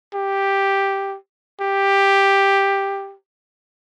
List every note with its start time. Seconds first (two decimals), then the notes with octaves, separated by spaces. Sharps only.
0.14 G4
1.61 G4